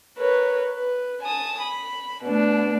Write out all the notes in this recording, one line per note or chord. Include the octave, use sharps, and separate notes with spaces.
A#4 B4 C#5
B4
G#5 A5 D#6
B5
B2 A3 D4